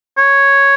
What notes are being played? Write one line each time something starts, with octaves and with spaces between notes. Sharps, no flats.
C#5